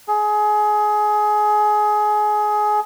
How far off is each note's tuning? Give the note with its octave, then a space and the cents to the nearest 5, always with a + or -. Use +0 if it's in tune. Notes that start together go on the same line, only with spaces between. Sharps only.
G#4 +20